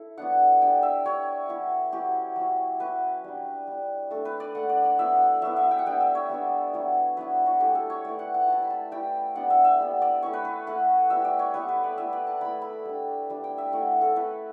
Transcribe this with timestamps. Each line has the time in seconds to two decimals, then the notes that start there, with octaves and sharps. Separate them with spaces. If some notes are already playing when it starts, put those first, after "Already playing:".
Already playing: E4 A4
0.18 F#3 B3 D4 F#5
0.62 G3 D4 G5
0.83 E5
1.05 G3 D4 C#5
1.49 F#3 C#4 E4
1.92 F#3 C#4 E4 G4
2.36 F#3 C#4 E4
2.80 F#3 C#4 E4 B4
3.24 G3 D4
3.67 G3 D4
4.11 A3 D4 A4
4.25 B4
4.40 D5
4.55 A3 D4 F#5
4.69 D5
4.84 D5
4.98 F#3 B3 E4 E5
5.42 F#3 B3 E4 E5
5.57 E5
5.71 G5
5.78 F#5
5.86 G3 B3 D4 G5
6.01 E5
6.15 C#5
6.29 G3 B3 D4
6.73 F#3 B3 E4
7.17 F#3 B3 E4 B4
7.46 F#4
7.60 A3 E4 G4
7.75 A4
7.90 C#5
8.05 A3 E4 D5
8.19 F#5
8.34 F#5
8.48 G3 C#4 E4 A5
8.62 B5
8.70 A5
8.91 G3 C#4 E4 G5
9.35 G3 B3 D4 F#5
9.50 E5
9.64 E5
9.80 G3 B3 D4
10.02 D5
10.22 A3 C#4 E4 C#5
10.33 B4
10.45 B4
10.67 A3 C#4 E4 F#5
11.10 G3 B3 E4 E5
11.25 D5
11.39 C#5
11.54 G3 B3 E4 B4
11.68 B4
11.84 D5
11.98 A3 E4 E5
12.13 D5
12.27 A5
12.41 A3 E4 B5
12.62 B5
12.85 G3 D4
13.30 G3 D4
13.44 G5
13.58 E5
13.72 A3 C#4 E4 F#5
14.01 A4
14.16 A3 C#4 E4 B4